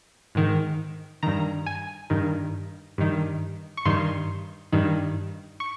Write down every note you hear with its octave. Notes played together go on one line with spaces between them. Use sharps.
G#2 D#3
G2 D#3 A#5
G#5
G2 D#3
G2 D#3
C#6
G2 D#3 C6
G2 D#3
C#6